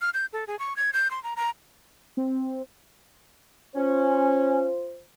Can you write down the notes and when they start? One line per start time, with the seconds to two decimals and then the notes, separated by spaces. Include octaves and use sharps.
0.01 F6
0.14 G6
0.33 A4
0.47 G#4
0.59 C#6
0.77 G#6
0.93 G6
1.11 C6
1.24 A#5
1.36 A#5
2.17 C4
3.76 C#4 F4 C5